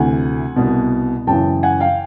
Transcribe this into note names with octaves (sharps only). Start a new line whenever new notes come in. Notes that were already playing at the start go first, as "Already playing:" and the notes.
Already playing: D2 C3 E3 F#5 G#5
C2 B2
F#2 C#3 E3 G5 A5
F#5 G#5
F5 G5